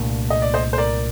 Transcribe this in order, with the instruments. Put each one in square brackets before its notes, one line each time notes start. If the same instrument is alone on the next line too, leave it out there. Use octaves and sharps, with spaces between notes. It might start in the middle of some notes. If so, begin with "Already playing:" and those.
Already playing: [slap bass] C2 A#2 A3 D4
[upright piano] D#5
D5
C5 D#5
C5
A#4 D5